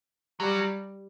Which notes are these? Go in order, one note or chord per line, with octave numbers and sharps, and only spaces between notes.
F#3 G3